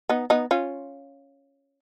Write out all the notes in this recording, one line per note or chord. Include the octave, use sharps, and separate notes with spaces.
B3 D#4
B3 D#4
C#4 F4